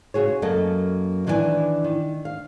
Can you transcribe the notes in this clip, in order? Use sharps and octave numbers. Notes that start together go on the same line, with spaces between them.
C#3 F#4 G#4 C#5
F#2 F#3 A#3 A4 D#5
D#3 E3 D4 D5 G#5
D#3
F5